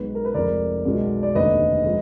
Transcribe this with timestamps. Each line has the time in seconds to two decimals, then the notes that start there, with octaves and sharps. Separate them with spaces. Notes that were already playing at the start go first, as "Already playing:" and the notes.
Already playing: B1 B2 G#3 B4
0.15 A#4
0.25 B4
0.34 F1 F2 F3 G#3 A#4 D5
0.85 B1 B2 G#3
1.23 D5
1.35 F1 D#2 D3 B4 D#5
1.85 F3 G#3